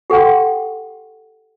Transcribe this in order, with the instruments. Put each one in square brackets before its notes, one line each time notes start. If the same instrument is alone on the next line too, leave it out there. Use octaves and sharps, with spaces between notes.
[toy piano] G4 A4 F#5 G5 C6